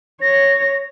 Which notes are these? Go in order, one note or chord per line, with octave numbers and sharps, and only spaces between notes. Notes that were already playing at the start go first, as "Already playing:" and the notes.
C#5 A#6